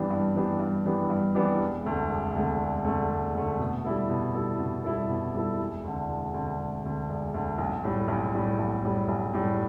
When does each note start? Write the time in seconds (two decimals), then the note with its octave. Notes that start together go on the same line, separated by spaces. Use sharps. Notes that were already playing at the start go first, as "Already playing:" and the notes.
Already playing: G2 E3 B3 D4 G4
0.10 G2
0.35 E3 B3 D4 G4
0.60 G2
0.85 E3 B3 D4 G4
1.10 G2
1.35 E3 B3 D4 G4
1.60 E1
1.85 D2 D3 A3
2.10 E1
2.35 D2 D3 A3
2.60 E1
2.85 D2 D3 A3
3.10 E1
3.35 D2 D3 A3
3.59 B2
3.84 G3 E4 A4
4.10 B2
4.34 G3 E4 A4
4.59 B2
4.84 G3 E4 A4
5.09 B2
5.34 G3 E4 A4
5.59 E1
5.84 D2 D3
6.09 E1
6.34 D2 D3
6.59 E1
6.84 D2 D3
7.09 E1
7.34 D2 D3
7.58 B1
7.84 A2 G3
8.08 B1
8.34 A2 G3
8.59 B1
8.84 A2 G3
9.08 B1
9.33 A2 G3